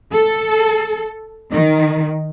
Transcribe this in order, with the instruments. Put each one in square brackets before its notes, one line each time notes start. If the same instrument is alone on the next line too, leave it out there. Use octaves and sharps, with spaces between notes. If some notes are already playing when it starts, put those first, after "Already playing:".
[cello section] A4
D#3